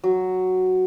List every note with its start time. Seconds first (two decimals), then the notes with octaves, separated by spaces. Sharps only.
0.04 F#3